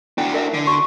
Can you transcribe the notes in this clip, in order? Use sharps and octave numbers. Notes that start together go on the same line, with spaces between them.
D4 E4 F#4 G5 G#5
A#4 E5 A5
D3
F#4 C6 C#6